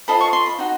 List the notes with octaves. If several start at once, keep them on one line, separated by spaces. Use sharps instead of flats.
F4 A4 C5 D#5 B5
C#6
C6
B5
D#4 F#4